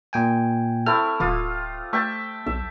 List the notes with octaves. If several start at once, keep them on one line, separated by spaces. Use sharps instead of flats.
A#2 G5 G#5
A3 C4 E4 F6
D1 F4 D6 D#6
A3 E5 G5 A5
B1 E5